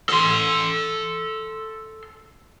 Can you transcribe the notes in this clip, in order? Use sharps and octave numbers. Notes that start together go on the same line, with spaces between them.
A4 C6